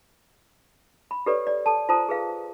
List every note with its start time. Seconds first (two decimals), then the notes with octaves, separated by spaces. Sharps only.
1.11 B5
1.26 G4 A4 B4 C#5 D5
1.47 D5
1.66 A4 A5
1.89 F4 C5 A5 A#5 D#6
2.09 G#4 B4 F5